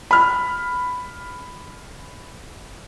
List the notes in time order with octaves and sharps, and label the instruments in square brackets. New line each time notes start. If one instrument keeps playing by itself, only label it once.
[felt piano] B5 F6